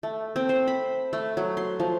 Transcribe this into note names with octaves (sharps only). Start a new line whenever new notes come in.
A3
C4
C5
B5
A3
F#3
C6
F3